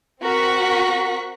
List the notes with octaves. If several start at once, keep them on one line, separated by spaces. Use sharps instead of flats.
C4 F#4 A#4 F#5 C#6 B6